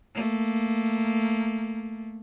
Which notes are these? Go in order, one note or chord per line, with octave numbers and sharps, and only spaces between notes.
A3 A#3